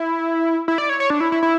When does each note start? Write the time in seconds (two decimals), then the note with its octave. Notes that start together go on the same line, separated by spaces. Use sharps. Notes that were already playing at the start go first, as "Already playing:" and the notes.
Already playing: E4
0.68 E4
0.78 D5
0.89 C#5
1.00 C#5
1.10 D4
1.21 E4
1.32 E4
1.43 E4